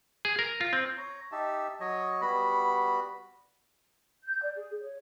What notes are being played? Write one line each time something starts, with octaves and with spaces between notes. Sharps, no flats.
G#4
A#4
F4
C4
C#5 A#5
D#4 G4 E5 A5
F#3 C#5 D#5
G3 B3 F#4 B5
G6
D5
G#4
C#5